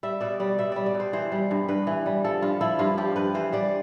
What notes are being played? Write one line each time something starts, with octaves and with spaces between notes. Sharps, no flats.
G3 E5
B2 D5
G3 D5
B2 E5
G3 D5
D5
B2
C5
E3 C5
G3
G2
G2 B4
E3
G3
F3 A4
G2 F4
F3 E4
G2 F4
F3 G4
G2 B4
E3 C5
G3 D5